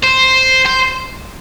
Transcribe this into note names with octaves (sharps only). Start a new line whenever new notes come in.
C5
C5